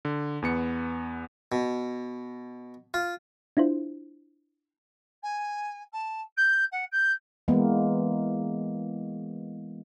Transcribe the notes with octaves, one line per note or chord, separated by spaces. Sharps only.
D3
E2 B3 C#7
B2
F4
D4 E4 F4 C5
G#5
A5
G6
F#5
G6
E3 G#3 A#3 B3